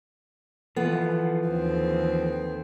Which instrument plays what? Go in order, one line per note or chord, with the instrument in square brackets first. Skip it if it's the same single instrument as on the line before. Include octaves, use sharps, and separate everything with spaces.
[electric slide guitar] E3 F3 [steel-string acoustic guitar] B3 [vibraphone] A4
[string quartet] D#2 C4